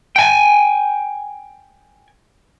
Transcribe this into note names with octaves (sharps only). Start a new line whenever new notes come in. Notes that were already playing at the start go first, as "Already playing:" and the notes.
G5 G#5